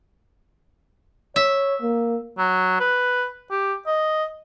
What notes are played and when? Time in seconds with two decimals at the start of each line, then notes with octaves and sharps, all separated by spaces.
1.36 C#5 E5
1.81 A#3
2.38 F#3
2.80 B4
3.51 G4
3.87 D#5